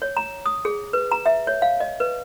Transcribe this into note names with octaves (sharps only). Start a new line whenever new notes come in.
C#5
A#5
D#6
G#4
B4
A#5
E5
C#5
F5
D#5
B4